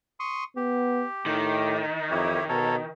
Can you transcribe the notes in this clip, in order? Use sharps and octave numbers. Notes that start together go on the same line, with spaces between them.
C6 C#6 D#6
B3 G4
A2 D#3
F2 E4 G4 C#5
B2 A4 A#4 C#5